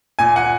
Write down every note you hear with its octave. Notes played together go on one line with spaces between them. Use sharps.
A#2 G#5
F#5 G#5